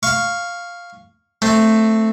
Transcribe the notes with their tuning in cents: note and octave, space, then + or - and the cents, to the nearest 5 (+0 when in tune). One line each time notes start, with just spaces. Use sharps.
F5 +0 C#6 +0
A3 +5 C4 +0